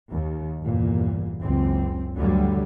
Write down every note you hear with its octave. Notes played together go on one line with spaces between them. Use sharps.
D#2
G1 E2 A#2
F#1 C#2 C4
D2 G2 D3 F#3 G3